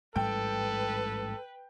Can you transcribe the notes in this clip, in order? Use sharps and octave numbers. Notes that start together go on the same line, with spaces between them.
A1 G#2 G3 A4 B4 G5